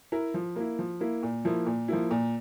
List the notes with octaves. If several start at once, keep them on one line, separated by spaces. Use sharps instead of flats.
E4 A#4
F3
A#3 E4
F3
A#3 E4
A#2
F3 A#3 E4
A#2
F3 A#3 E4
A#2